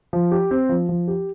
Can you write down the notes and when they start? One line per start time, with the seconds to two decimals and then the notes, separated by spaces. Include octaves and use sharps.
0.13 F3
0.31 G4
0.51 C4
0.69 F3
0.89 F3
1.08 G4